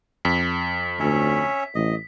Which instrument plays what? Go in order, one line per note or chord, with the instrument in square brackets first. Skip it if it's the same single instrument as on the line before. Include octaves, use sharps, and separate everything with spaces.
[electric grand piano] F2 [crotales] B6
[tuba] D2 [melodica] C#4 C#5 E5
[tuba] A1 [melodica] D#5